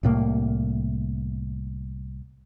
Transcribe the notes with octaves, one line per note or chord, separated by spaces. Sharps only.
C2 A2 A#3